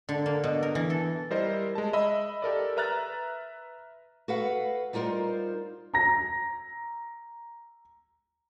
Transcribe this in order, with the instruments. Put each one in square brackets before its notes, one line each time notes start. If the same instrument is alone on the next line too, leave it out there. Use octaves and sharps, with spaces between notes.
[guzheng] D3
A#3
B2
A#4
E3
A4
[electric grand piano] G3 E4 A#4 C5 D#5
G#3 A5
D#5 E5 B5 E6
G4 A4 A#4 D5
B4 E5 A#5 F6 F#6 A6
[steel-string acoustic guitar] F#4 A4 B4 F5 F#5
G3 D#4 F4 A#4 C5
[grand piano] A#5 A#6